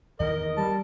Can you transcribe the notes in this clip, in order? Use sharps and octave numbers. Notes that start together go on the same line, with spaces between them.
E2 D#3 E3 A#4 D#5
G3 A5